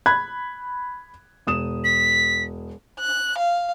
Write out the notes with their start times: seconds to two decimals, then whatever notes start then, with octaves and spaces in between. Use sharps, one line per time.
0.06 B5 F#6 G#6
1.47 E1 D#6 E7
1.84 B6
3.00 F#6
3.38 F5